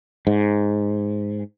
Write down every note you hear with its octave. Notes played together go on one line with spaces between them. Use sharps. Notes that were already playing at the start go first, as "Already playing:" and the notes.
G#2